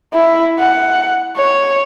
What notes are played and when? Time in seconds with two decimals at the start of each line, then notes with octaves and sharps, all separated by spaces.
0.14 E4
0.59 F#5
1.37 C#5